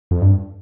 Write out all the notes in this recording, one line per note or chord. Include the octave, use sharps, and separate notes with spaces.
F2
G2